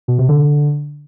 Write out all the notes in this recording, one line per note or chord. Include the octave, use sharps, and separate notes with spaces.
B2
C3
D3